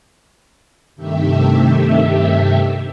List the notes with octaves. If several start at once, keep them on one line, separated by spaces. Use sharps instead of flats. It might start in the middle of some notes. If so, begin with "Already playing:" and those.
G2 C3 D#3 A3 G4 E5